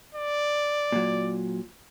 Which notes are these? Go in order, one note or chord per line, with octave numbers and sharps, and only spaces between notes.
D5
A#2 F#3